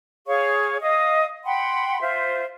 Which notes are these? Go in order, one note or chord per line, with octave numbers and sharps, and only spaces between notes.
G#4 C#5 F5 C#6
D#5 F5 D#6
F#5 G5 B5 C6
F4 C5 E5